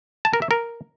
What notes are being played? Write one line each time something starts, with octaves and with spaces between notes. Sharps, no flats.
A5
A#4
E5
A#4